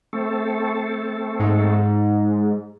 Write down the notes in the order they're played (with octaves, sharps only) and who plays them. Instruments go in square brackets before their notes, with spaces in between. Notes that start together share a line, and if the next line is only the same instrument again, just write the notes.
[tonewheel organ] A3 C4 A4
[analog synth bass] G#2